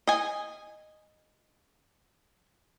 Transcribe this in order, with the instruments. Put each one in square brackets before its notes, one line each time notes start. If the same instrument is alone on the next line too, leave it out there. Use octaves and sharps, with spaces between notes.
[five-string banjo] D#5 G#5